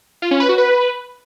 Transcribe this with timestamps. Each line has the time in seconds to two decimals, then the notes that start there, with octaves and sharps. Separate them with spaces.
0.22 F4
0.31 C#4
0.40 B4
0.49 F#4
0.58 B4